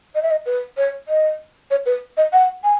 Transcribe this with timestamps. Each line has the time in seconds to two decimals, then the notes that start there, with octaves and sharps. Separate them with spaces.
0.15 D#5
0.23 E5
0.31 D#5
0.46 B4
0.77 C#5
1.08 D#5
1.71 C#5
1.86 B4
2.17 D#5
2.33 F#5
2.64 G#5